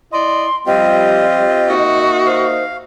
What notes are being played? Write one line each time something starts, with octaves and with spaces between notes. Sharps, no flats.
E4 D5 D#5 C6
F3 G3 C4 F4 G4 D#5
A#3 D#4 F#4 E5
C5 F5